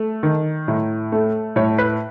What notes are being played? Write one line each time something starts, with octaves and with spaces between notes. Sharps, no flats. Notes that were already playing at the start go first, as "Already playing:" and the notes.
Already playing: A3
D#3
A2
A3
A2 C#5
B4